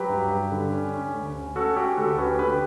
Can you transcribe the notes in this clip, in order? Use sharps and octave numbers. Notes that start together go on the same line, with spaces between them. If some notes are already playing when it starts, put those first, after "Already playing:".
Already playing: F#3 G4 B4
G2
G2
D3
C#4
C#4
D2
C#4
C#4 F#4 A4
C#4 G4
D2 F#4 A4
C#4 G4 B4
D3 G4 B4